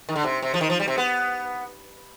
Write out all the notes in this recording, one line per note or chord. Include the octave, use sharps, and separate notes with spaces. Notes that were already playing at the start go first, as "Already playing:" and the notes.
D#3
D3
C3
C3
F3
D#3
F3
G3
C3
B3